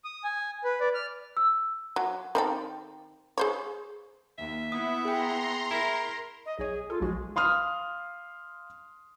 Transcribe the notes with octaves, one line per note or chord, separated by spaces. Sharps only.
D#6
G#5
B4
D5
F6
E6
F#3
D#3 C4 A4
G#4 C5 C#5
D#2 E5
B3 E4 D#6
G#4 G5 A#5 C6
E4 A#4
D#5
B1 G#4 C#5
F4 A4
B1 F3 G#3 F#4
F5 C6 D#6 F6